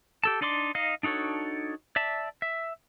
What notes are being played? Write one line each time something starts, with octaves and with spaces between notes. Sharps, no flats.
G4 A4 A5
D4 D#4 D5 C6 D6
D#4 D#5 F5
D4 D#4 F#4 A4 C#5
D5 E5 A5
E5